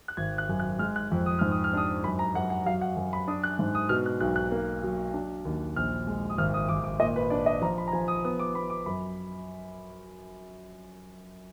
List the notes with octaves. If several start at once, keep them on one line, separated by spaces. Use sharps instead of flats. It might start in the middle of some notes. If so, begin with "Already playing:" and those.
F#6
G#1 G#6
F#6
F#2
F#6
G#3 F6
F#6
F2
D#6
G#2 F6
D#6
F6
D4 D#6
F#2 B5
A#5
F#2 F#5
F#5
F#3 F5
F#5
F#2
B5
D4 D#6
F#6
G#2
D#6
B2 F6
F#6
B1 F#6
F#6
A#3
F#3
D4
D#2
A#1 F6
G#3
D#6
G#1 F6
D#6
G#1 D6
D6
A#2 D#5
B4
D4 D5
D#5
F3 A#5
B5
A#5
F3 G#5
D#6
B3 D#6
D6
B3 B5
D6
F#2 B5